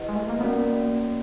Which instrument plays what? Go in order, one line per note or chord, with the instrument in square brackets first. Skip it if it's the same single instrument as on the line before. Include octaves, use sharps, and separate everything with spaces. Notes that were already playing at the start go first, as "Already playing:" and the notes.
Already playing: [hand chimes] E4 G4 B4 D#5 F#5
[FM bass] G#3
A3
A#3
[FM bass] B3 [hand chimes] C#4 F#4 A#4 D5
[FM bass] A#3